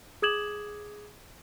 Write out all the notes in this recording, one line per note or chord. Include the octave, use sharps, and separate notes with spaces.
G#4 D6 D#6 G#6 E7 F#7